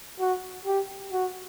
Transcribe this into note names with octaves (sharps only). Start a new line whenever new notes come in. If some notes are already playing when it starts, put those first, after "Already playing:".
F#4
G4
F#4